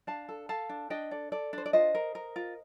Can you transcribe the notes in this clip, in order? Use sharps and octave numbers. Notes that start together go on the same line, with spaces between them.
D4 F5 A5
A4
A4 F5 A5
D4
D4 D#5 G5
A4 D5
A4 D5
D4 C5
D5
F4 C5 D#5
A#4
A#4
F4